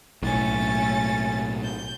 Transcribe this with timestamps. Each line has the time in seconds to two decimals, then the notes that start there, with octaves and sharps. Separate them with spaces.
0.22 B1 A2 A3 C#4 A6
1.63 G6